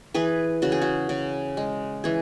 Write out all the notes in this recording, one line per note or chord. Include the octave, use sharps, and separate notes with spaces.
E3 G#4 B4
C#3 F#4
G#4
F#4
C#3
G#3
E3 G#4